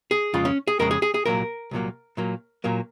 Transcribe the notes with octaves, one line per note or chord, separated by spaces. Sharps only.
G#4
F2 C#3 G#3 F4
C#4
G#4
F2 C#3 G#3 A#4
G#4
G#4
G#4
C2 A#2 F#3 A#3 A#4
C2 A#2 F#3 A#3
A#2 F#3 A#3
A#2 F#3 A#3